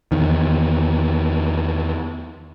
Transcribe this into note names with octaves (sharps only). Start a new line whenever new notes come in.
E2 D#3